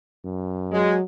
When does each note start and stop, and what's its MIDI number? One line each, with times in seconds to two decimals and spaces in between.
0.24 0.85 42
0.72 1.02 54
0.72 0.94 56